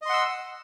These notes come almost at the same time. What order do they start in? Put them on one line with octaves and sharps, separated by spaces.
D#5 C6 F#5 E6